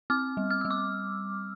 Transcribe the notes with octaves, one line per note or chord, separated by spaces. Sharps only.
C4 D6 F6
G3
F6
G3 E6
D6